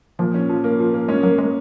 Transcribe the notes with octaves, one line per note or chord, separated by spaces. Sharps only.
A#2 F3
C#4
F3
A#3
F3
A#3
G#3 C#4
F#3 A#3
G#3 A#3